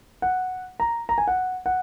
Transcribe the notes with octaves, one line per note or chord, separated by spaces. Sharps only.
F#5
A#5
A#5
G#5
F#5
F#5